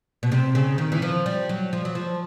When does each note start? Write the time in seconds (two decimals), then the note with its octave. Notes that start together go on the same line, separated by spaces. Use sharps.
0.23 B2
0.32 C3
0.55 C#3
0.78 D#3
0.92 E3
1.02 F3
1.26 G3
1.49 F#3
1.73 F3
1.85 F#3
1.95 F3